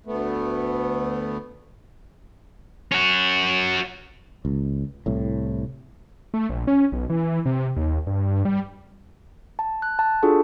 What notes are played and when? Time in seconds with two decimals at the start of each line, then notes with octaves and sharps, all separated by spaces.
0.06 D2 A3 B3
2.92 C#4 F#4
4.45 C#2
5.06 C2 A2
6.34 A3
6.49 A#1
6.67 C#4
6.92 B1
7.10 E3
7.46 C3
7.76 D#2
8.07 G2
8.45 G3
9.59 A5
9.82 F#6
9.99 A5
10.23 D4 F4 F#4 G#4 A4